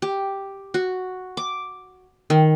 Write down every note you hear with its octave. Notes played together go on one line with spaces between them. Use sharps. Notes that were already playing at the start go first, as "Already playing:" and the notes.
G4
F#4
D6
D#3